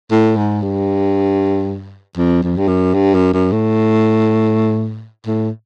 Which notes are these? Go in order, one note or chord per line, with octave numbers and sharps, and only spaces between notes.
A2
G#2
G2
F2
F2
G2
F#2
G2
F#2
F#2
A2
A2